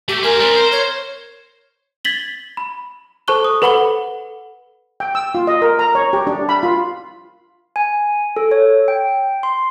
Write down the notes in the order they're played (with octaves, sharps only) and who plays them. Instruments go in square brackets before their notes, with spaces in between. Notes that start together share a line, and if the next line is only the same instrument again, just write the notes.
[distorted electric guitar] A3 [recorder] G4
[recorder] A#4 [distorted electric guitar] C5 G#5
[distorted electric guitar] G3 C4
C5
[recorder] C#5
[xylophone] G#6 A6 B6 F#7 G7
B5
A4 C5 A5 C#6 F#6 G7
D#6
A4 B4 F#5 B5 C#7 G7
[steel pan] G5
E6
F4
D#5
A#4
A#5
C#5
G4
D4
B5
F4
[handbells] G#5
A4
C#5
G5
C6